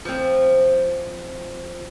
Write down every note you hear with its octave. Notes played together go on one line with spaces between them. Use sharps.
F3 C4